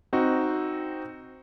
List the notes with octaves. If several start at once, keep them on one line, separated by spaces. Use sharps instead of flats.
C4 D#4 F#4